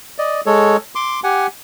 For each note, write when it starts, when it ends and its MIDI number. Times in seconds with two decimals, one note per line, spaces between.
0.18 0.41 74
0.18 0.41 75
0.46 0.77 56
0.46 0.77 69
0.46 0.77 73
0.95 1.20 84
0.95 1.20 86
1.24 1.47 67
1.24 1.47 78
1.24 1.47 80